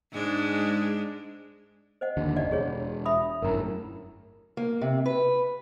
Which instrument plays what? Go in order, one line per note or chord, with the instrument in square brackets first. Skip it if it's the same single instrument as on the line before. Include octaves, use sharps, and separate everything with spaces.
[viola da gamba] G#2 G#3 D4
[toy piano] C5 D#5 F#5
[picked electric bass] D#2 D3
[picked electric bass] F#1 [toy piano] D5 D#5 F#5
[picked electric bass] E1 [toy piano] G4 G#4 C#5
[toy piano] E5 B5 D#6
[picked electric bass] G1 F#2 A2 [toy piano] A#4 A#5
[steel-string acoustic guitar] A#3
C3
B4